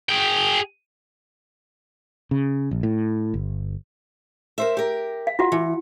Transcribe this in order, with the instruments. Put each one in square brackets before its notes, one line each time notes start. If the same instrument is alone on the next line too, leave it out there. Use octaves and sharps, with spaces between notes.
[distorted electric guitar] G#4 G5
[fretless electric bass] C#3
A#1
A2
G1
[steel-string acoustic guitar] A#4 C5 E5
G4 A#4
[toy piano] F5
F4 F#4 F#5
[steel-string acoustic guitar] E3